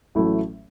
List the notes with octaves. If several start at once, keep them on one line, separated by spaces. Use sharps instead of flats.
A1 A2 F#3 A3 E4